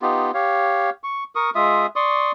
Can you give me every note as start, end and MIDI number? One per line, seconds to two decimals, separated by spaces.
0.02 0.31 59
0.02 0.31 63
0.02 0.31 65
0.02 0.31 67
0.34 0.90 67
0.34 0.90 73
0.34 0.90 77
1.04 1.24 85
1.35 1.50 70
1.35 1.50 85
1.35 1.50 87
1.55 1.86 56
1.55 1.86 65
1.55 1.86 76
1.55 1.86 87
1.96 2.32 74
1.96 2.32 84
1.96 2.32 85
1.96 2.32 87